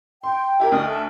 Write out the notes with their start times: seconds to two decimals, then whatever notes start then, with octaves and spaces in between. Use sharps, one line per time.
0.23 G5 C6
0.60 E4 G4 A#4
0.72 D2 D#5 D#6 F6
0.87 A4 E5